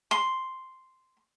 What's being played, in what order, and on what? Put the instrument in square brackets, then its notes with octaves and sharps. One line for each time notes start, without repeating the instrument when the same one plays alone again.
[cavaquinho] C6